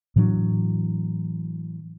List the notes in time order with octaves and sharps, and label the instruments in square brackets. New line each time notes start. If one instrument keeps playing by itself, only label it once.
[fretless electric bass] A2 E3 F#3 D4